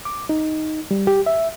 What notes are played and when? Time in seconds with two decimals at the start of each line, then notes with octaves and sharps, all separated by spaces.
0.05 D6
0.29 D#4
0.91 G3
1.07 G4
1.26 E5